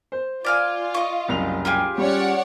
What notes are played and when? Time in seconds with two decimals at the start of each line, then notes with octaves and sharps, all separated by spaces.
0.12 C5
0.45 F4 D5 F5 G#5
0.94 D#5 C#6
1.28 F#1 C2 F7
1.65 F4 G4 G#4
1.98 G3 C#4 C#5 D5 F#5